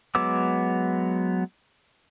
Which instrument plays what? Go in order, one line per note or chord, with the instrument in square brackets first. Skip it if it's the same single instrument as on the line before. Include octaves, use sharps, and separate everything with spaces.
[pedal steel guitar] F#3 G#3 B3 D6 E6